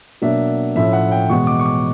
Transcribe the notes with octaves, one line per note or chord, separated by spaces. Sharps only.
B2 F#3 A#3 D4 E5
A2 F3 A3 C#4 E5
F#5
G5
E2 B2 G#3 B3 C#6
D6
C#6
D6